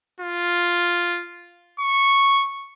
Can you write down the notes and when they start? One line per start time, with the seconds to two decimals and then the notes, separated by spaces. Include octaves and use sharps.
0.21 F4
1.80 C#6